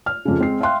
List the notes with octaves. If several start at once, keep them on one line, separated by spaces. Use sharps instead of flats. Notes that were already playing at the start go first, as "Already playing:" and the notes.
F6
F2 C#3
G#3 C4 C7
E5 F5 G5 C6 F#6